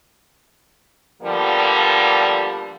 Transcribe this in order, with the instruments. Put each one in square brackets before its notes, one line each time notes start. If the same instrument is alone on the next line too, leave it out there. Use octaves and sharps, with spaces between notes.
[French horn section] D3 F3 G3 A#3 B3